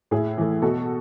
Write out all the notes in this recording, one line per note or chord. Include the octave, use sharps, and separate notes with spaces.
A2 E4 G#4
E3 A3
B2 F#4 A4